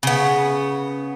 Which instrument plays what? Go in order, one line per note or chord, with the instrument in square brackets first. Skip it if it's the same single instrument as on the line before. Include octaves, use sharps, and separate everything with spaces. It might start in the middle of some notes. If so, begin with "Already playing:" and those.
[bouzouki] C#3 B3